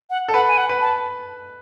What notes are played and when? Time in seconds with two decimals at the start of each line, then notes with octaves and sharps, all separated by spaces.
0.10 F#5
0.28 A4
0.33 B4 F#5
0.48 G#5
0.57 F#5
0.69 B4
0.81 A5